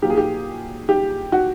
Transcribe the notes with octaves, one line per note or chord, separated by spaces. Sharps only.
A#2 F#3 A#3 G4
G#4
G4
G4
F#4